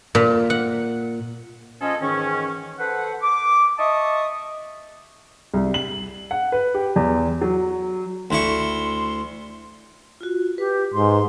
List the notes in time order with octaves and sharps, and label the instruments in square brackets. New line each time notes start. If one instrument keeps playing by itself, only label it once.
[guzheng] A#2
F#5
[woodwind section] F3 C#4 F4 G#4 A4 D#5
G#2 D#3 E3 C#4
A4 B4 C5 F#5
D6
D#5 E5 A5 C#6 D#6
[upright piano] C2
F#7
F#5
B4
G4
E2
F#3
[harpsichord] D2 E4 C#6 [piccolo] C6
[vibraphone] F4 F#4
[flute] G4 [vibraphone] B4
[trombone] G#2 [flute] C6